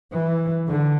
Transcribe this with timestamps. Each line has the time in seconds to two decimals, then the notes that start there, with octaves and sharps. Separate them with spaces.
0.12 E3
0.68 D3